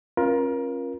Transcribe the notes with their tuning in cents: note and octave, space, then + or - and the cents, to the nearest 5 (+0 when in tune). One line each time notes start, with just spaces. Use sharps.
C#4 -35 F4 +0 A#4 +30